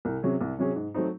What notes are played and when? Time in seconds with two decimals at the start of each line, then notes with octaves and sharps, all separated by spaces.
0.05 C2
0.23 C3 F#3 C#4 G#4
0.41 C2
0.59 C3 F#3 C#4 G#4
0.76 G#2
0.94 F#3 A3 C4 D#4